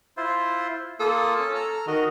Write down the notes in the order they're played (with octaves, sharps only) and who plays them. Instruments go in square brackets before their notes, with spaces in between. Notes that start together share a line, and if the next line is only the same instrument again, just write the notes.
[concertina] E4 F4 C5
[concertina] A#3 F4 D#6 [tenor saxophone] A4
[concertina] C#4
A#5 F6
[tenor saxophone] D#3 [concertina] F#4 D#5